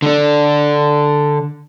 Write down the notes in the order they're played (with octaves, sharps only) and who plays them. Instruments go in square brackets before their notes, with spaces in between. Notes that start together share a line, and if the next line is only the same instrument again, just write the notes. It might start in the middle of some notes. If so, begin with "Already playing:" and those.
[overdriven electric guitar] D3 D4